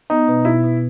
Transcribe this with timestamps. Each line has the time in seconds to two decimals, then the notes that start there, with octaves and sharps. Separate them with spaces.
0.10 B3 D#4
0.28 B2
0.45 B2 E4
0.63 B2